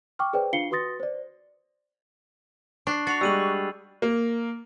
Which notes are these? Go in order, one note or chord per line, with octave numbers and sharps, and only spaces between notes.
G5 C#6 D6 F6
G#4 B4 C5 D5 G5
D4 F4 F5 C7 C#7 G7
F#4 B4 C6 D#6 A6 A#6
C5 D5
D4 C#6 F#6 C7
F#4 C#6 A6 C7 F7
G3 G#3 E6 D#7 F#7
A#3